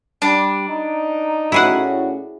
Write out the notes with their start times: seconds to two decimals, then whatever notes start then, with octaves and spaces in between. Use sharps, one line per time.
0.22 G3 D4
0.69 D#4
1.52 A2 C#4 E4 F#4 G#4 F#5